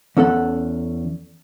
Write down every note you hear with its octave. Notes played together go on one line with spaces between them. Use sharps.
E2 C#4 A4 F#5